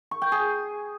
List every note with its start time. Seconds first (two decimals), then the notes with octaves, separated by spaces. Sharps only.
0.11 C#6
0.22 G5
0.32 G#4